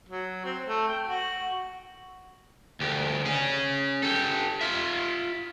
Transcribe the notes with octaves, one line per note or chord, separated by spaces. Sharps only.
F#3
C4
A3
G5
F#4
D2 G4
C#4 G#4
G4 A4
F4 E5